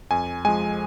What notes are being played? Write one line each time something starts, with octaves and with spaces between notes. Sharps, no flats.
F2 G#5
F3 G#3 G#5